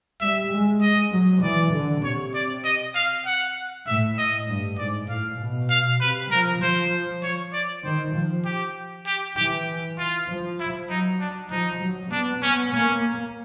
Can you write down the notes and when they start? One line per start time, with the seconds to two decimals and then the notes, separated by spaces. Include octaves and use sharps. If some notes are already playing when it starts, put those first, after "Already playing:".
0.20 G3 E5
0.51 G#3
0.82 D#5
1.12 F#3
1.42 E3 D5
1.73 D3
2.04 C3 C#5
2.34 D5
2.64 D#5
2.95 F5
3.26 F#5
3.87 A2 E5
4.18 D#5
4.48 G2
4.78 G#2 D5
5.09 A2 F5
5.39 B2
5.70 F5
6.01 C3 B4
6.31 F3 A#4
6.62 F3 C5
7.23 C#5
7.53 D5
7.84 D#3 C5
8.14 F3
8.45 G4
9.07 G4
9.36 E3 G4
9.98 F4
10.28 F3
10.59 E4
10.89 F#3 D#4
11.20 D4
11.51 F3 D#4
11.81 F#3
12.11 B3 D4
12.42 B3 C#4
12.72 A#3 C#4